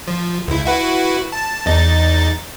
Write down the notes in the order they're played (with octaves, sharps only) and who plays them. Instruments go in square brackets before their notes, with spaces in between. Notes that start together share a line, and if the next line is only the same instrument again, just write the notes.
[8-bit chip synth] F3
C#2 E4
E4 F#4 B4
A5
E2 D#4 A6